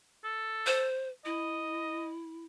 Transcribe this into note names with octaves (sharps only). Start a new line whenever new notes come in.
A4
C5
E4 D#5